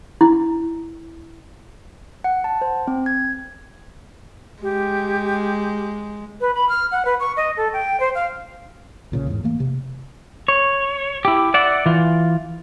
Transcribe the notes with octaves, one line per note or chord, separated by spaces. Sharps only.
E4
F#5
A5
C5
C4
G#6
G#3 G4
B4
B5
F6
F#5
B4
C#6
D#5
A4
G5
C5
F5
B1 A#2 C#3
E2 G#2
E3 A3 A#3
C3
C#5
E4 G4
D5 E5 F#5
E3 F4